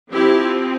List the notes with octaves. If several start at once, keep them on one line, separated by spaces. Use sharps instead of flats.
F3 C4 E4 G4